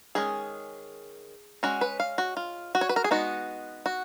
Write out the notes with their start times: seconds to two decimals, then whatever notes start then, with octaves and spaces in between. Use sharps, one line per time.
0.15 D#3 G#3 C#4 G#4
1.63 G#3 C#4 F#4
1.81 B4
2.00 F5
2.18 F#4
2.37 F4
2.75 F#4
2.81 C#5
2.89 B4
2.96 A#4
3.04 G#4
3.11 G#3 B3 D#4 F#4
3.86 F#4